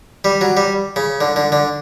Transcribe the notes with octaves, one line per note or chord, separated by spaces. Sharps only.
G3
F#3
G3
C#3
D3
D3
D3